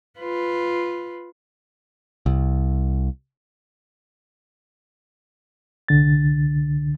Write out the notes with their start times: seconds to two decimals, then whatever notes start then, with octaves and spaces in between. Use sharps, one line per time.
0.19 F4 B4
2.26 C2
5.88 C2 D3 A6